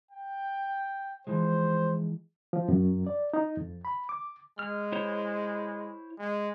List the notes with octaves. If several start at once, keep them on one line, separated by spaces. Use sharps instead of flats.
G5
E3 F3 G#3 C5
F3
F#2
D5
D#4
F2
B5
D6
G#3 F6
E4 C5 C#5
G#3